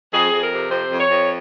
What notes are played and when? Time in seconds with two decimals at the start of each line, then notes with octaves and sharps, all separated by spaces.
0.14 F2 G#4
0.33 F2
0.42 A#4
0.52 C3
0.71 F2 C5
0.91 F2
1.00 C#5
1.10 F2